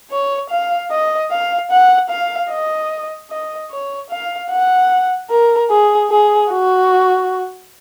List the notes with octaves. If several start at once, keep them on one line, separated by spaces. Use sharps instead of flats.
C#5
F5
D#5
F5
F#5
F5
D#5
D#5
C#5
F5
F#5
A#4
G#4
G#4
F#4